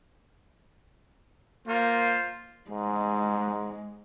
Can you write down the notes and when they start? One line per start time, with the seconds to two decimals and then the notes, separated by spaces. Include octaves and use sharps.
1.68 A#3 F4 C5
2.70 G#2 G#3